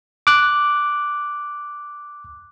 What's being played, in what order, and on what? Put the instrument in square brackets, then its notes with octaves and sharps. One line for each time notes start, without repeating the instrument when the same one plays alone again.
[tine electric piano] D6 F#6